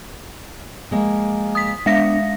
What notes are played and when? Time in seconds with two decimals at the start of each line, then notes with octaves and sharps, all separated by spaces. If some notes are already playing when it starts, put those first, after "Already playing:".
0.91 F3 G#3 A#3
1.55 D#6 B6
1.86 G#3 B3 D4 E5 A#6